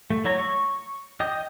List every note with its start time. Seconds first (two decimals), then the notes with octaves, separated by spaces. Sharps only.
0.10 A3
0.25 F#3 E4 C#5 A#5
0.39 C#6
1.20 D#5 G5 D#6